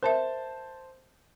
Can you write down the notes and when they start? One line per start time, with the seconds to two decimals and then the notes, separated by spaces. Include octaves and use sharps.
0.03 A#4 C5 E5 A5